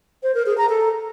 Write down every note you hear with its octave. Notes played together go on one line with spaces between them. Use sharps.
C5
A#4
G#4
A#5
A4